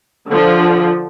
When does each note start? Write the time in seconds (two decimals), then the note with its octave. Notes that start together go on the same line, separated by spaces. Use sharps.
0.28 D3 F3